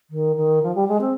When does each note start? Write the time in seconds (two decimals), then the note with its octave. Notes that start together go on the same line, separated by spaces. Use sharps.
0.10 D#3
0.36 D#3
0.63 F3
0.75 G3
0.88 G#3
1.01 C4